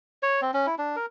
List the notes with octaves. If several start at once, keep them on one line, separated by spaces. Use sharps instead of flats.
C#5
C4
C#4
E4
D4
A#4